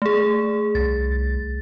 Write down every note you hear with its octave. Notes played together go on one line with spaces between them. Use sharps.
A3 G#4
C2 A6